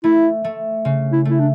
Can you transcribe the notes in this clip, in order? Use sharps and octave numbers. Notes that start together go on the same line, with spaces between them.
A3 E4
A3
C#3
E4
A3 E4
D4